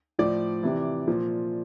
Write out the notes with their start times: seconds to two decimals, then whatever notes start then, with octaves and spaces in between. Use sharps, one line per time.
0.19 A2 F3 D5
0.63 C3 E3
1.08 A#2 F3